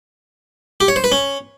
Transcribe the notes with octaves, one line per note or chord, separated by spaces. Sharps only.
G4
C#5
C5
B4
C#4